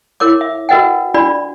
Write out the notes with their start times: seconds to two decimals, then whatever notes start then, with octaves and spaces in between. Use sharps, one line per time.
0.20 E4 A#4 C#5 D6
0.41 E5
0.69 F#4 A#4 B4 D#5 F#5 G5
1.14 D4 F4 F#4 D5 B5